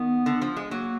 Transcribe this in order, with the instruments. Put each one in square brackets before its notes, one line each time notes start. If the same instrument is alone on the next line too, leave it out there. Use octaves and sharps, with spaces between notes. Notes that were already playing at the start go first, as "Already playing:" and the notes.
Already playing: [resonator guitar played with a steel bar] D#3 [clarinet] B3
[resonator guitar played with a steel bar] D3
F3
G#3
[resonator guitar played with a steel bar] F#3 [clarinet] A#3